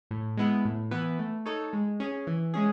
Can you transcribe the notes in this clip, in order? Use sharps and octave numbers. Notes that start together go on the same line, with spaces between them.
A2
G#3 B3 E4
A2
E3 B3 E4 B4
A3
D#4 A4 C#5
G#3
C#4 G#4
E3
G#3 C#4 G#4